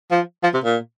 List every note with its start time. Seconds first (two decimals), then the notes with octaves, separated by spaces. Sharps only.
0.11 F3
0.43 F3
0.54 C3
0.64 A#2